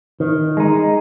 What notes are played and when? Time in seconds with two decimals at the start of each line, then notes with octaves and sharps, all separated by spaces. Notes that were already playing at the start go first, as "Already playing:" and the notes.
0.20 D#3
0.57 G#3 D#4